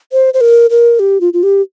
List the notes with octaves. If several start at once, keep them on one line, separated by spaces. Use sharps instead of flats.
C5
C5
A#4
A#4
G4
F4
F4
G4